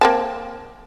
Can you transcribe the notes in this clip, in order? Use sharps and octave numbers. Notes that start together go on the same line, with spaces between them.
A#3 C4 A5